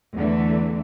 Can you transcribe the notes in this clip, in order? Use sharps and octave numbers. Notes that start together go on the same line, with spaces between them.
E2 D3 E3 A3